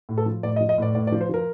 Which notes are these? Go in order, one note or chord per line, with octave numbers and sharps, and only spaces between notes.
A2
A4
F3
A2 D5
D#5
F3
D#5
A2 D5
A2 D5
D5
F3
C5
F3 A#4